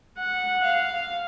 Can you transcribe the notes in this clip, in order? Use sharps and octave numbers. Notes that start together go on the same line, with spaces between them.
F#5
F5